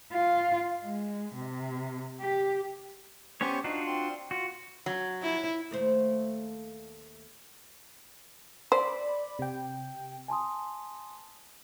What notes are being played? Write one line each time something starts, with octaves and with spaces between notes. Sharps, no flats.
F4
G#3
C3
G4
B3 C#4 G4 C5 C#5 C#6
D4 D#4 F4 F#4
C4 C6
F4 F#4
F#3
E4
D#2 A3 C5
C5 D5 B5 D6
C3 G5
G#5 A5 C6 D#6